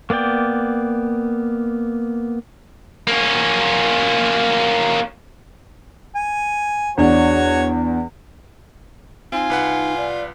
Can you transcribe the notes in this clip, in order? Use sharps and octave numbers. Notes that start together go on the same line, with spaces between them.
A#3 B3 D5 G5
A#3 C#4
G#5
E2 D4 F#4 C#5
C4 D#4 F4 G#5
C2 B4 F#5
D5